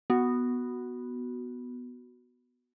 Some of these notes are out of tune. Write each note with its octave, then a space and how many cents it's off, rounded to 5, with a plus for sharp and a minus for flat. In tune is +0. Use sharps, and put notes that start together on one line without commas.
B3 +0 F#4 +0